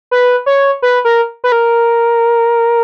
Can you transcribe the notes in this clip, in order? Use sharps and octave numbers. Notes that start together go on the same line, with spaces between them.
B4
C#5
B4
A#4
B4
A#4